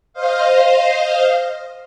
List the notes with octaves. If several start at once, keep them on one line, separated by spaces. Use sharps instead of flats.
C5 D#5 F5